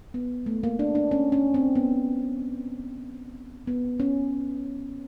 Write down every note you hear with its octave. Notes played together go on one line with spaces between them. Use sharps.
B3
A3
A#3
D4
D4
C#4
C#4
C4
B3
B3
C#4